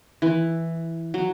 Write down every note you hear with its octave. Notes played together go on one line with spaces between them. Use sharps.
E3
F#3